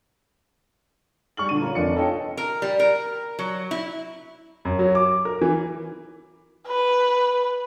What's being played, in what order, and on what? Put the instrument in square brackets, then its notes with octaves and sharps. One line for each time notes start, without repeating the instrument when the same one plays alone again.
[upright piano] G3 C#6 F6 F#7
A#2 D3 D#7
C#4 D4 F4 A#4
F1 D4 D#5 C#7
F4 A4 C#5 D#5 G5
[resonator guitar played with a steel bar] A#4
G3
A#4
F#3
E4
[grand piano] F#2
F#3
D6
A#4
E3
[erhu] B4